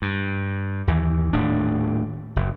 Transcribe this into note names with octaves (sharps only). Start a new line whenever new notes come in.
G2
D#2 E3
D#1 A2 D4
F#1